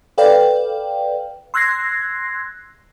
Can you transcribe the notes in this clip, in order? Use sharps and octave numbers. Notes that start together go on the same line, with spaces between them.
A4 B4 D5 F5 G5
C6 E6 F#6 G#6 A#6 C7